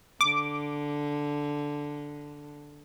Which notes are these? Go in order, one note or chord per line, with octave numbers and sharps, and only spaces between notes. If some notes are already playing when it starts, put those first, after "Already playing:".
D3 D6